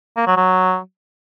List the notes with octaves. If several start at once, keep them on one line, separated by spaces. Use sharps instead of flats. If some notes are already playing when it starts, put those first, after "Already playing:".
A#3
F#3
F#3